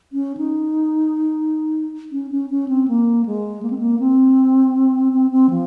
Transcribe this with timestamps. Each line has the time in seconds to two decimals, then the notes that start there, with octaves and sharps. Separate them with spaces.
0.13 C#4
0.37 D#4
2.12 C#4
2.31 C#4
2.50 C#4
2.68 C4
2.88 A#3
3.26 G#3
3.63 A#3
3.70 C4
3.78 A#3
4.00 C4
5.13 C4
5.31 C4
5.50 F3